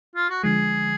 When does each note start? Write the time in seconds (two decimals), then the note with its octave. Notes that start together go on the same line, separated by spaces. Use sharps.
0.15 F4
0.30 F#4
0.43 D3 F3 G#3 G#4